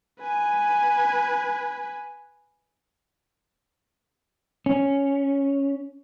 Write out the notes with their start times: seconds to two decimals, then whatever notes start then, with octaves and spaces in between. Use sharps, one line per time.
0.20 B4 G#5
4.66 C#4